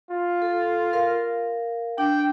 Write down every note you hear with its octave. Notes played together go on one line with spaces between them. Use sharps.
F4
A4
A#4 F5
D4 G5